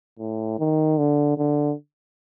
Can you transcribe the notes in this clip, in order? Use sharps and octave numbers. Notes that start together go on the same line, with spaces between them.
A2
D#3
D3
D3